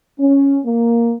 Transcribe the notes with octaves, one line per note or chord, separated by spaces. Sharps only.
C#4
A#3